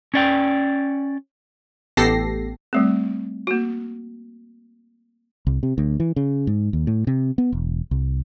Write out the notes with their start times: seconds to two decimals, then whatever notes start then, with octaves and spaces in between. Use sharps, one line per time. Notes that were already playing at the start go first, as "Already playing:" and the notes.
0.14 C#4 D5 G5
1.97 A1 B3 G4 A4 A#6 C7
2.73 G3 A3 C4
3.47 A#3 F#4
5.47 C2
5.63 C3
5.78 D2
6.00 E3
6.16 C#3
6.47 G#2
6.73 D#2
6.87 A2
7.07 C3
7.38 B3
7.52 E1
7.91 C2